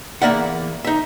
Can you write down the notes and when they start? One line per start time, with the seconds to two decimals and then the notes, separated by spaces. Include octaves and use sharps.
0.22 E2 G3 A#3 D5 E5 F#5
0.85 D#4 E5